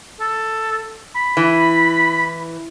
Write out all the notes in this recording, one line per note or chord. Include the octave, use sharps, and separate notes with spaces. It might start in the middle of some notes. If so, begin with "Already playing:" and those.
A4
B5
E3